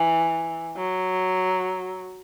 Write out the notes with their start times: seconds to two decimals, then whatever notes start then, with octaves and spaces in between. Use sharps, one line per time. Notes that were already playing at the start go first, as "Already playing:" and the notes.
Already playing: E3
0.77 F#3